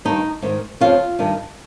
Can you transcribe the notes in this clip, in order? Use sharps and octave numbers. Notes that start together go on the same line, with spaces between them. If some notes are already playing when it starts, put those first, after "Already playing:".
G2 D#3 D#4
G#2 D#3
F2 C#3 F4
G2 D#3